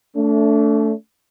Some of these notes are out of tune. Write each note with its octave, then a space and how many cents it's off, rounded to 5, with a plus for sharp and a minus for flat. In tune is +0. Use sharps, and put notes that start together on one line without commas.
A3 +5 D4 -35